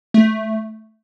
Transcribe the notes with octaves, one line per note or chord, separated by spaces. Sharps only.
A3